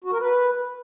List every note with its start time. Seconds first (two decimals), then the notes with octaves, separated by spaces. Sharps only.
0.04 F#4
0.12 A#4
0.20 B4